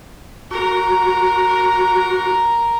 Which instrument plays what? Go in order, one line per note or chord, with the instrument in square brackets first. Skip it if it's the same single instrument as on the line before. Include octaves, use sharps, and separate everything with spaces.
[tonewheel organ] F#4 [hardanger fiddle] A#4 A#5